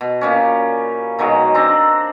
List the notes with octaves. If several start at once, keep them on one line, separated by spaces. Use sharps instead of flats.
B2
A#2 G3 C#4
B2 D#3 F#3 G#3
C4 D4 A#5